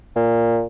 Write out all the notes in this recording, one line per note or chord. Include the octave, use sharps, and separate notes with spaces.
A#2